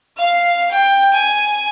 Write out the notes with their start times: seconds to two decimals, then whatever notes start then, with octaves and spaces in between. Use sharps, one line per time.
0.17 F5
0.71 G5
1.13 G#5